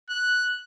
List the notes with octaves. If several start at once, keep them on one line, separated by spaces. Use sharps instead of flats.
F#6